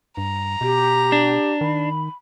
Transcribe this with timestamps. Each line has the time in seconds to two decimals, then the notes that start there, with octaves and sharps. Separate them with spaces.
0.17 G2 A#5
0.61 B2 G4
1.12 D4
1.61 D#3 B5